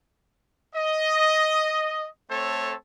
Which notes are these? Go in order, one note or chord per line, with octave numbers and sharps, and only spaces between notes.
D#5
A3 C4 A4 C#5